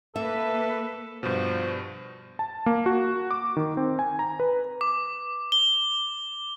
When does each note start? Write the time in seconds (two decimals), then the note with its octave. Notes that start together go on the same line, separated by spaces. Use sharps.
0.16 A#3 A4 B4 E5
1.23 G2 B2 F3
2.39 A5
2.66 A#3
2.86 F#4
3.31 D6
3.57 D#3
3.77 C4
3.99 G#5
4.19 A#5
4.40 B4
4.81 D6
5.52 G7